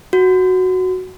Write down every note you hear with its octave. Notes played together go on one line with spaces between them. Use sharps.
F#4